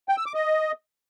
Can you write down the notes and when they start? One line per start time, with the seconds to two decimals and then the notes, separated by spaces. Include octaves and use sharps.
0.09 G5
0.17 E6
0.26 D6
0.35 D#5